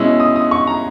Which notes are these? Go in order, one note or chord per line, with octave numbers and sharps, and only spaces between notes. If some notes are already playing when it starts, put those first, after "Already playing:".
Already playing: B2 G#3 C#4 E4 E6
D#6
D#6
C#6
A#5